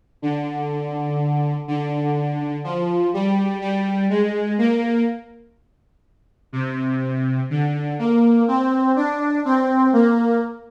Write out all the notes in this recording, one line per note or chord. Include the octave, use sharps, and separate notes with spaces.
D3
D3
F3
G3
G3
G#3
A#3
C3
D3
A#3
C4
D4
C4
A#3